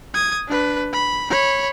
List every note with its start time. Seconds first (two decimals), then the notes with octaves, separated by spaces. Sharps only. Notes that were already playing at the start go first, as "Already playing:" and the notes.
0.14 D#6 G#6
0.48 D4 B4
0.93 B5
1.30 C#5 B5